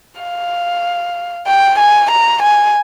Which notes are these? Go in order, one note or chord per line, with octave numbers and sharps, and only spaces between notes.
F5
G5
G#5
A#5
G#5